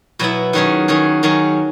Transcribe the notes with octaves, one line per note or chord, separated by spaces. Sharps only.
B2 F#3 B3 E4
D#3 F#3 C#4 G#4
D#3 F#3 C#4 G#4
D#3 F#3 C#4 G#4